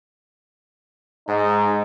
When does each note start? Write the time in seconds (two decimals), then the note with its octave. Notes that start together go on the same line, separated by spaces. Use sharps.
1.28 G#2 D#4